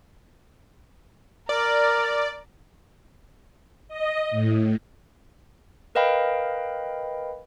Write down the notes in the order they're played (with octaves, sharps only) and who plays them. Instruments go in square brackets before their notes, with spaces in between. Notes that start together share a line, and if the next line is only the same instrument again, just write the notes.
[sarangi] A#4 [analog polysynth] D5
[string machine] D#5
A2
[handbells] A#4 B4 D#5 F5 G5 B5